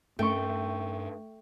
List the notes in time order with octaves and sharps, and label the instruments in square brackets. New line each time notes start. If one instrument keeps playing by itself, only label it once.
[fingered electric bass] G2 C#4 [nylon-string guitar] A3 [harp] G5 C#6